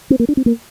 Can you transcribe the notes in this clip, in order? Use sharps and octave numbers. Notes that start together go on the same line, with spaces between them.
C4
A#3
D4
C4
A#3